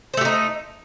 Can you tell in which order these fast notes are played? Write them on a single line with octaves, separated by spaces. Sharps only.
C5 A3 G4 D#4